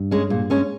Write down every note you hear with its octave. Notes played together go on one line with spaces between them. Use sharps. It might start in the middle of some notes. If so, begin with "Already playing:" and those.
Already playing: G2
G#3 C#4
A#2
G#3 C#4